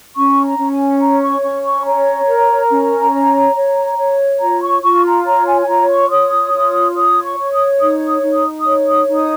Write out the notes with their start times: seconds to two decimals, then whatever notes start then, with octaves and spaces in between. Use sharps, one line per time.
0.16 C#4 C#6
0.44 A#5
0.59 C#4
0.72 G#5
1.00 C#5 A#5
1.22 C#6
1.43 C#4 C#6
1.64 C#6
1.85 C#5 A#5
2.28 A#4
2.70 C#4
3.13 C#5
3.55 C#5
3.98 C#5
4.40 F4 A#5
4.62 C#6
4.83 F4 C#6
5.05 A#5
5.25 C#5 A#5
5.47 G#5
5.62 G#5
5.67 F4 A#5
5.89 C#6
6.10 C#5 D#6
6.53 F4
6.95 C#5 D#6
7.24 C#6
7.38 C#5
7.53 D#6
7.79 D#4 D#6
8.06 D#6
8.22 D#4
8.33 D#6
8.60 D#6
8.65 C#5
8.87 D#6
9.08 D#4
9.14 D#6